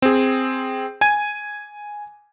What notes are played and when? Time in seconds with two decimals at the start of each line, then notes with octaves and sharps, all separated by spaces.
0.02 C4 G#4
1.01 G#5 G#6 D#7